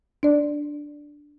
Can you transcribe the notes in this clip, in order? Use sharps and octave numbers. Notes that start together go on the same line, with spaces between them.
D4 D5